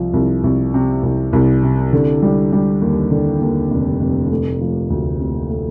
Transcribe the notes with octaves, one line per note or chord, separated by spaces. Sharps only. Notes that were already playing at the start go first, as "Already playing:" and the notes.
Already playing: C2 F3
C2
C2
C3
C2
C2
C3
D3
G3
G3
D#2
D3
D#2
F1
F1
A3
F3
D2
C3
A3